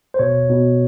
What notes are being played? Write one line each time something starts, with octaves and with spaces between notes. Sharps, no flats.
C5
B2 C#5
B2